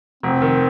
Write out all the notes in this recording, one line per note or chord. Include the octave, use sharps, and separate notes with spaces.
F1 C4
D#3